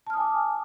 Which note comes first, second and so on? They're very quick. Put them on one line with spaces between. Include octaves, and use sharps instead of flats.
A5 F6 D#6 G#5 D6